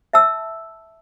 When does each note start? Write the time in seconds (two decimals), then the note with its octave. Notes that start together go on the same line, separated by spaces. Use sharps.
0.13 E5 A5 E6